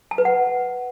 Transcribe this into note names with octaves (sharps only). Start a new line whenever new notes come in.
A5
B4
F#5